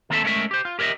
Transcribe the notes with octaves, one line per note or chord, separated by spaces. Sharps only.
D#3 A#3 C4 A4 E5 A5
G#3 A3 C#4 A#4 E5
G4 C5
F4
G4 A#4 C#5 D#5 E5